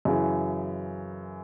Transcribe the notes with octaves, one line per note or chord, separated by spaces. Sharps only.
F#2 C#3 E3